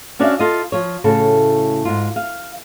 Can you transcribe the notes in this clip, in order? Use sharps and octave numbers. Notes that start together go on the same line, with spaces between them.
C#4 D4 F#4 D5 E5 F5
F4 A4 D#5
F3 C#5
A2 C#3 F#4 A4
G#2 F4
F5